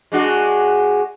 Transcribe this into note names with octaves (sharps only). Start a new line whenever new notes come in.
G#3 D4 F#4